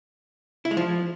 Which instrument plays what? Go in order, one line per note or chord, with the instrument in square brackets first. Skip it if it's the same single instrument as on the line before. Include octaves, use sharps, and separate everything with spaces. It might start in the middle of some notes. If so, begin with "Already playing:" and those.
[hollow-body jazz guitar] E4
G#3
F3